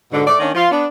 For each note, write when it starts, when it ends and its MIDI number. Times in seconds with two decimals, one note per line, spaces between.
0.12 0.24 44
0.12 0.24 47
0.12 0.24 50
0.26 0.35 44
0.26 0.35 57
0.26 0.35 74
0.39 0.51 51
0.39 0.51 58
0.39 0.51 61
0.39 0.51 62
0.54 0.66 53
0.54 0.66 65
0.71 0.85 59
0.71 0.85 62